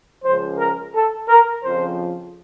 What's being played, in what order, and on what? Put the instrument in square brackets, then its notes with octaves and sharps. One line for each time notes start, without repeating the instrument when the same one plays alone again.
[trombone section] C#2 C#3 F3 C5
A#4
A4
A#4
F2 C#3 F3 C5